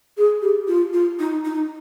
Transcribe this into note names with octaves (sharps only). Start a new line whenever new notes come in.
G#4
G4
F4
F4
D#4
D#4